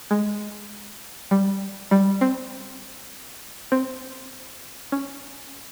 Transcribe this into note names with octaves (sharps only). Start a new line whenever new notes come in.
G#3
G3
G3
C4
C4
C#4